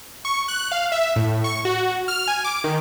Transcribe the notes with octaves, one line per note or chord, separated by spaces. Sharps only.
C#6
F#6
F5
E5
A2
C#6
F#4
F6
G#5
D6
D#3